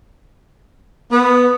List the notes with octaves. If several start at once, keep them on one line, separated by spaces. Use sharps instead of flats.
B3